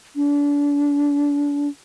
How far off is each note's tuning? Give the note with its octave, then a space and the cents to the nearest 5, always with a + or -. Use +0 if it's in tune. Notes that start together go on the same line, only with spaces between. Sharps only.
D4 -35